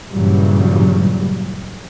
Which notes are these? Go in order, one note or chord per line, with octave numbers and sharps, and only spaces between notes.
G2 A#2 C#3 E3 F#3 G3